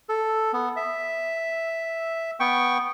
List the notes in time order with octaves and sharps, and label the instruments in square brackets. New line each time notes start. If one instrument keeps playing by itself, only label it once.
[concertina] A4
B3
E5
B3 G5 C#6